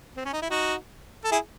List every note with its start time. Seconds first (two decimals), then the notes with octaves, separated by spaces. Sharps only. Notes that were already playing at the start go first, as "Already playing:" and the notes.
0.17 C4
0.25 C#4
0.33 D#4
0.42 E4
0.50 D#4 F#4
1.24 A4
1.32 E4 G#4